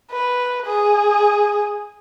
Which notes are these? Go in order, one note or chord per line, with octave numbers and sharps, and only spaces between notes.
B4
G#4